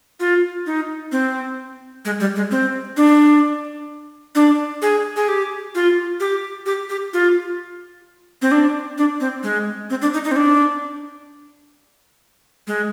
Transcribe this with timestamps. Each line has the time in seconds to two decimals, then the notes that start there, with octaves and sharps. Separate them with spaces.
0.20 F4
0.66 D#4
1.12 C4
2.05 G#3
2.20 G3
2.36 G#3
2.51 C4
2.97 D4
4.35 D4
4.82 G#4
5.16 G#4
5.28 G4
5.75 F4
6.20 G4
6.66 G4
6.90 G4
7.13 F4
8.42 C4
8.51 D4
8.98 D4
9.20 C4
9.43 G#3
9.90 C4
10.02 D4
10.14 D#4
10.24 D#4
10.31 C4
10.36 D4
12.67 G#3